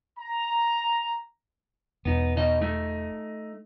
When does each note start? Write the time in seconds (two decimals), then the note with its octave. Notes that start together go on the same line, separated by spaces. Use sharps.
0.19 A#5
2.05 E1 B3 D#4
2.37 B2 D#4 D#5
2.62 A3 D#4